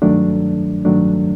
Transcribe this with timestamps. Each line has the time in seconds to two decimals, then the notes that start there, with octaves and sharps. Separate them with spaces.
0.02 G2 D#3 F#3 A3 D4
0.85 G2 D#3 F#3 A3 D4